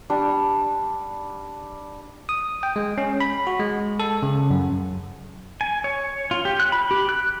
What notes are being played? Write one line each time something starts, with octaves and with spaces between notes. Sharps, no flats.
G3 D4
D#6
G5
G#3
C#4
B5
F#4
G#3
A4
C#3
F#2
G#5
C#5
F4
G4
F#6
B5
G4
F#6